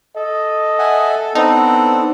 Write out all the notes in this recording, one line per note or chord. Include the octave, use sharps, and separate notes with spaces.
A4 D#5
E5 F#5 G#5
B3 C4 D4 D#4 A4